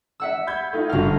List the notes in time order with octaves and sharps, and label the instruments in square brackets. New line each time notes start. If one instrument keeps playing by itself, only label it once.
[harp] E5 F#5 E6
[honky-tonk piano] B5 G6 G#6
A3 D#4 F4
[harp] G1 F6 [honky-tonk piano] F4 F#4